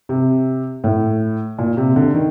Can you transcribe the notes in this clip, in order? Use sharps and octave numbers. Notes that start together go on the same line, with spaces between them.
C3
A2
A#2
C3
D3
D#3